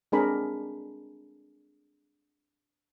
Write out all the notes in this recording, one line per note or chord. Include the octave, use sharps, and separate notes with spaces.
G#3 C4 D4 G#4 A#4 B5